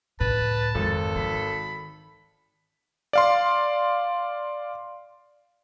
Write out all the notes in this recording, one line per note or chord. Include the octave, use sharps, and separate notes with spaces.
C#2 A2 B4 A5
G#1 F2 A4
D#3 B5
D5 F5 C6